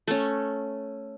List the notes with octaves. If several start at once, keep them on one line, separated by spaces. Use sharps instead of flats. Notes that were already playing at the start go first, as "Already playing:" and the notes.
A3 C#4